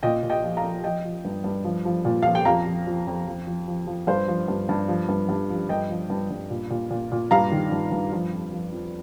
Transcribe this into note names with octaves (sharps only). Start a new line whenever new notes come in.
A#2 D#5 G5
A#2
D#5 G5
F3
F5 A#5
F3
F3 D#5 G5
F3
G2
G2
F3
F3
A#2
F3 F5
G5
F2 F5 A#5
F3
F3
F2
F3
F3
F3
F3
G2 C5 F5
F3
G2
G2
F3
G2
G2
F3
G2 D#5 G5
F3
G2
G2
A#2
A#2
A#2
A#2
G2 F5 A#5
D#3
G2
G2
F3
F2
F3
F2